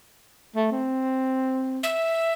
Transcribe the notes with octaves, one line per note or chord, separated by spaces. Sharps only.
A3
C4
E5